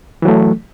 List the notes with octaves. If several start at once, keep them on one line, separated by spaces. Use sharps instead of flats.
E3 F#3 A3